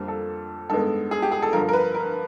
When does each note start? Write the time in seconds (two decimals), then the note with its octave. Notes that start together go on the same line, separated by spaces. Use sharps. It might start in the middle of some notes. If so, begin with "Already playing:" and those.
Already playing: F2 D3 G3 A#3
0.08 A4
0.70 G2 D#3 G#3 B3 A4
1.11 G#4
1.22 G4
1.32 G#4
1.42 A4
1.53 G2 D3 F3 A#4
1.69 A#4
1.73 B4
1.95 A#4